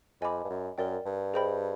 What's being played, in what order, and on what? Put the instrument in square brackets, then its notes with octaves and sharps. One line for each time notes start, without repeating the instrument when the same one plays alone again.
[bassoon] F2 [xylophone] D#5 G#5 B5 D6
[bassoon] G2
F#2
[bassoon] F#2 [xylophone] A#4 D5 G5
[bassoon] G2
[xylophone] G#4 C5 D#5 G5 B5